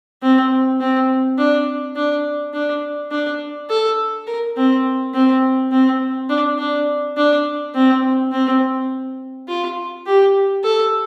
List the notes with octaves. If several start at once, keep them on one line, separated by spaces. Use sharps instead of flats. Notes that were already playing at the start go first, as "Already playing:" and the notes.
C4
C4
D4
D4
D4
D4
A4
A#4
C4
C4
C4
D4
D4
D4
C4
C4
F4
G4
A4